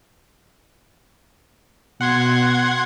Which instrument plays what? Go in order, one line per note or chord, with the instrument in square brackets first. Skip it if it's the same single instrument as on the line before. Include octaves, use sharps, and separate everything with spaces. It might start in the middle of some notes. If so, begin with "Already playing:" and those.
[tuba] B2 [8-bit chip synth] F#5 C6 G#6